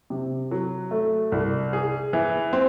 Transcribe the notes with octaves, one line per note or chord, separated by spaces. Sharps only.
C3
F#3
A3
C2
G#4
E3
C4